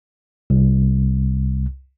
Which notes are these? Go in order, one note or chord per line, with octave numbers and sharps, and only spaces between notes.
C2